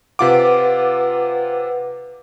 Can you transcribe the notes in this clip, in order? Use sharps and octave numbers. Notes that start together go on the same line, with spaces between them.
C3 F4 B4 F#5 D6